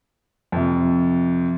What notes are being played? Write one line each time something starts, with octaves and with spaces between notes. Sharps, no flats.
F2 C3